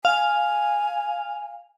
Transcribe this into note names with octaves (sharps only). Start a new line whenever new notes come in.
F5 G#5